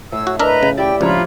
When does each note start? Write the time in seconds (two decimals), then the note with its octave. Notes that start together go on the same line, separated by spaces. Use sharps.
0.12 A2 C#5 E6
0.27 F#4
0.40 D4 A#4 B4 D#5 E5 A#5
0.63 C#3
0.77 E4 G4 D5 G5
1.01 C#2 F3 D4 F4 C#5 A#5 B5